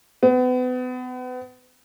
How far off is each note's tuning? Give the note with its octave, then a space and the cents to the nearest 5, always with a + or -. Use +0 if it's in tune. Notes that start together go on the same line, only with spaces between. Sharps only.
B3 +35